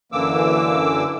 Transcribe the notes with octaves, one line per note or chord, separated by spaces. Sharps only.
F#2 D3 E3 A#3 D6 E6